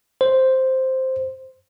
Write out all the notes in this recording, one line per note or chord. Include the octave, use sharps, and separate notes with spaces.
C5